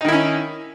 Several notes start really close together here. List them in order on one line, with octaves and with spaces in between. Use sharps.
D#4 D#3 E4 C#4